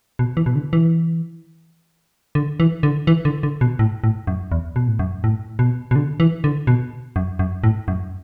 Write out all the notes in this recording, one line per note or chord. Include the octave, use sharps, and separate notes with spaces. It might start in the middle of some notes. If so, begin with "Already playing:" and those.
B2
E3
B2
D3
E3
D3
E3
D3
E3
D3
D3
B2
A2
A2
F#2
E2
B2
A2
F#2
A2
B2
B2
D3
E3
D3
B2
F#2
F#2
A2
F#2